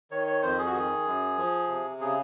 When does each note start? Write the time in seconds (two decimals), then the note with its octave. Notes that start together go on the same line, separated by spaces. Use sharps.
0.11 D#3 C#5
0.27 C#5
0.43 F2 C5
0.58 G#4
0.66 F#4
0.73 D#3 G#4
1.05 F#2
1.38 F3
1.68 C3
2.00 C#3 G#4